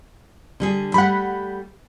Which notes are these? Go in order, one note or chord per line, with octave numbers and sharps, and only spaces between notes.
D3 G3 G#4
G3 A3 F#5 B5